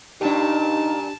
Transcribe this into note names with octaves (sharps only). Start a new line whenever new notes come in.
G2 A#2 D4 D#4 G4 A5